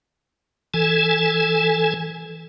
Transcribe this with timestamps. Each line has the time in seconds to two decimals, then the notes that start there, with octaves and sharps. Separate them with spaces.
0.74 E3 A4 G#5